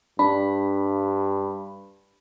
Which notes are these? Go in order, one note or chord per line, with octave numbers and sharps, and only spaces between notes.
G2 D4 B5